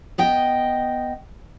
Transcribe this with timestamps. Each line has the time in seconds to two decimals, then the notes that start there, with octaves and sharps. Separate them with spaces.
0.18 B3 D#5 G5